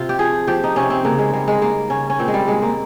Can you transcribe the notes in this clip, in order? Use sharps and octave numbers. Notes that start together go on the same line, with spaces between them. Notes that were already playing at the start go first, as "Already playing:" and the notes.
Already playing: C3 F4
G4
F3 G#4
F3 G4
D#4
C3 C#4
C4
C#3 A#3
G#3
G3 G#3
G#3
C#3 A#3
C#3 C#4
C#4
A#2 C4
G#3
G3
A#2 G#3
A#3